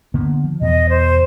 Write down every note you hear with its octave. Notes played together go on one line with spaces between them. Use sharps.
D3 A#3 B3
F3
E2 B2 E3 D#5
C5